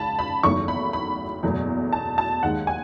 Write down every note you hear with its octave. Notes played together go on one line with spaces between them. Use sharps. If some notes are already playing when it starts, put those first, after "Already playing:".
Already playing: C#2 C#3 A5 B5
B5
F#1 E2 D#3 F#3 A3 C#6
B5
B5
F#1 E2 B2 F#3 A3
A5
A5
D#2 D#3 G#3 F#5
G#5